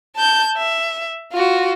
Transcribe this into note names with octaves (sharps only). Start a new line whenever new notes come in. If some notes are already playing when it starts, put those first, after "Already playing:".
A5 G6
E5
F4 F#4